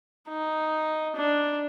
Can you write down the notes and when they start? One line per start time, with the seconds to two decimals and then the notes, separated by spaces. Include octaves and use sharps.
0.29 D#4
1.16 D4